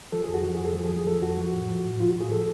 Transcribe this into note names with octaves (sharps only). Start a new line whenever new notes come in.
F3 A4
G#4
F2
F#4
F3
G#4
F2
A4
F3 G#4
G#4
F3
G#4
F3 A4
F2 F#4
F3
A2
F3
A2
F3 F4
F#4
A2
G#4
F3 A4